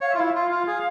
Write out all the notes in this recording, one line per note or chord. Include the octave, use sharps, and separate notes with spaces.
C#5 F5
E5
F4
E4 F5
E5
F4 F5
F4
G#4